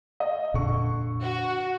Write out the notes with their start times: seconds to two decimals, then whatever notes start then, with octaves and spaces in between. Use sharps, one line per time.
0.20 D#5
0.54 F2 A#2 D3 D4 C#6
1.22 F#4